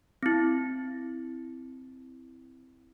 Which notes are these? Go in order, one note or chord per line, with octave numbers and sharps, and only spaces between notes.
C4 E4